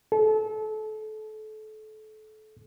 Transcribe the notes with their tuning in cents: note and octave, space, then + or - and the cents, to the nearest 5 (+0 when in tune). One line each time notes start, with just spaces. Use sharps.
A4 -30